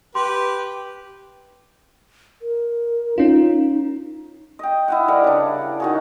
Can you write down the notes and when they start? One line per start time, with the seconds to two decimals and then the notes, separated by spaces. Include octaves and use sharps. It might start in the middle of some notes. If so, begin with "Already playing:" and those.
0.15 G4 B4 C6
2.42 A#4
3.18 C#4 D#4 F4
4.59 D#5 G5
4.88 E4 D#5 F#5
5.08 G3 A#4 F#5
5.24 C#3 D4
5.80 D#3 F#4 G#4